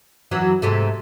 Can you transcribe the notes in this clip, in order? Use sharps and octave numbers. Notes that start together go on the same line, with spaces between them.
F#2 E3 F#3
G#2 C3 A3